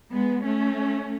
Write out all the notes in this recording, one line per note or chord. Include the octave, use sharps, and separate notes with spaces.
G#3 B3
A3 C#4